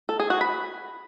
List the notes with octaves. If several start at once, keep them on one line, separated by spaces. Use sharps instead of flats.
A4
G#4
F#4
B5